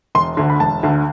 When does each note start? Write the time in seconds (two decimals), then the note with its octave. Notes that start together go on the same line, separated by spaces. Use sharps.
0.15 E1 C6
0.37 D2 D3
0.50 B5
0.60 E1 A5
0.83 D2 D3